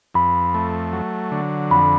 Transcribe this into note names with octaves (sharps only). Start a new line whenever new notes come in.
F2 B5
A3
F#3
D3
F2 B5